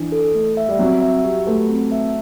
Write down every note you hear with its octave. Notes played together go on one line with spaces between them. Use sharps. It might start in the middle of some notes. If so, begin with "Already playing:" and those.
Already playing: E3 D4
A4
A3
E5
G3
F#3 C4
E5
G4
A3 B4
C4
E5